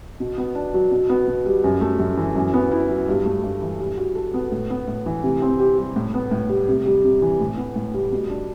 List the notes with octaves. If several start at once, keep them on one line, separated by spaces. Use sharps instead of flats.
B2
B3
D4
F#3
B2
B3
B2
G3
F#2
A3
F#2
E3
F#2
B3
E4
F#3
G2
A3
G2
E3
G3
F#4
A4
B3
A2
B3
A2
E3
C3
C4
G4
G3
A2
B3
A2
G3
C3
G3
C3
E3
A2
B3
A2
G3
B2
D4